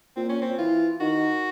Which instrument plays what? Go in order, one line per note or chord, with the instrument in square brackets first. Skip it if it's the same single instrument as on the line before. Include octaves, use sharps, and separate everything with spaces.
[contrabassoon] A#2 [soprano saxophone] C4
[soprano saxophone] C#4
C4
[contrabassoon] E3 [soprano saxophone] F4
[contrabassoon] D#3 [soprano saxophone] F#4